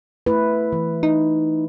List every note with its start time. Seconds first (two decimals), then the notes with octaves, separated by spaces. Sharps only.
0.26 A3 E4 B4
0.73 E3
1.03 D#4